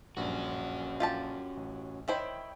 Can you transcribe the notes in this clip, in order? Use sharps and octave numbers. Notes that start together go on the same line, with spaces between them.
A#1 G2 C#4 F#4
F4 G4 A5
A1
D#3 E4 C5 C#5 G5